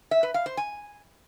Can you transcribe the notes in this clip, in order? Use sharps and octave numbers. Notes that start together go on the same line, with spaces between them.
E5
B4
F5
C5
G#5